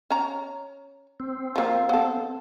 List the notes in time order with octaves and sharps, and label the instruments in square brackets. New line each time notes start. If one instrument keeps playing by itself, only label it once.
[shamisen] C#4 A#5
[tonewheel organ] C4
[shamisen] F3 A#3
B3 A4